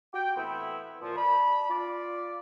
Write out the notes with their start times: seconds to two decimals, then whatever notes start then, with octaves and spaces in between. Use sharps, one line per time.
0.14 F#4 G5
0.36 A2 E3 B3 C4 E4
1.01 A#2 F3
1.16 D5 A5 B5
1.70 F4 D5